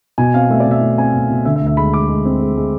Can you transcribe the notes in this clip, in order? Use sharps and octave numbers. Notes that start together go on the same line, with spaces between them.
B2 G#5
C4 F5
A3 E5
D5
B2
E5
A3
C4 G#5
B2
B2
D3 E5
E5
D2
E5
G#3 B5
G#3 D6
G#3
C4
G#3
G#3